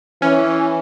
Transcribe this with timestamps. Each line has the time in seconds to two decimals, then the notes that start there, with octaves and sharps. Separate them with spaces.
0.22 E3 C#4